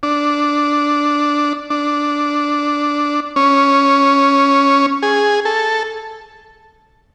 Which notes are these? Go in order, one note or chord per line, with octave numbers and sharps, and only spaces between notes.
D4
D4
C#4
G#4
A4